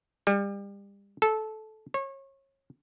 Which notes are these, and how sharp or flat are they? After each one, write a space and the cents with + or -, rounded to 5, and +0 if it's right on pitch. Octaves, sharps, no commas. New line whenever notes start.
G3 +30
A4 -15
C#5 -30